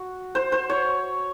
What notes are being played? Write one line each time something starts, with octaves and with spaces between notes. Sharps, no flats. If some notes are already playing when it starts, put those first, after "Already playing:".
Already playing: F#4
C5
C5
C#5